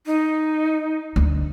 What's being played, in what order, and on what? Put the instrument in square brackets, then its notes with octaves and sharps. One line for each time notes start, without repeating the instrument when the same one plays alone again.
[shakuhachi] D#4
[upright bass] D2